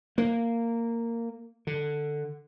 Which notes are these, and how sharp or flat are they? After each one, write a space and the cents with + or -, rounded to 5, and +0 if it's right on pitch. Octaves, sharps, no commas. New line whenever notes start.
A#3 -10
D3 +10